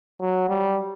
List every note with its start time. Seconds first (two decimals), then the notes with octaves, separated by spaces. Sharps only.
0.20 F#3
0.49 G3